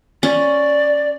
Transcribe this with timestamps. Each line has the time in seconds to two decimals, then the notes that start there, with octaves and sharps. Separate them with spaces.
0.23 C#4 D5